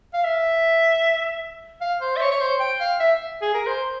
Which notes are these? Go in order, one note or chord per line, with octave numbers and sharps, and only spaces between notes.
F5
E5
F5
C5
E5
C#5
C#5
C5
G5
F5
E5
G#4
A#4
C5